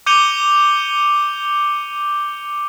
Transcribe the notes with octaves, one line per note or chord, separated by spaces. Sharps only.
D6 G6 C#7 D#7 F7 G7